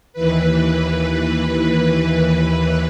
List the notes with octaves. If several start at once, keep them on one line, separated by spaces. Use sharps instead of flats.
D#2 E3 B4